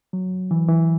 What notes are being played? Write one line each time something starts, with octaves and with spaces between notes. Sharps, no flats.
F#3
E3
E3